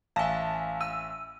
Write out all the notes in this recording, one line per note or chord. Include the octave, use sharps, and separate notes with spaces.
A1 E5 F5 G#5 A5
E6 D#7